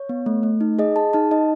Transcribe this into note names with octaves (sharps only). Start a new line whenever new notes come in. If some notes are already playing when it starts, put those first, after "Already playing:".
Already playing: C#5
B3
A3
A3
D#4
G#4 D#5
G#4 A5
D#4 A5
D#4 D#5